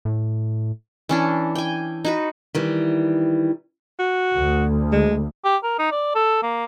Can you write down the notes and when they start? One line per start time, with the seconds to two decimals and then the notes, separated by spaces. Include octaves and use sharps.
0.05 A2
1.09 E3 C#4 D4
1.55 G5 G#5
2.05 D#4 F#4 B4
2.55 D#3 E3 G3
3.99 F#4
4.34 D2
4.92 G#3
5.45 G4
5.64 A#4
5.79 D#4
5.92 D5
6.15 A4
6.43 A#3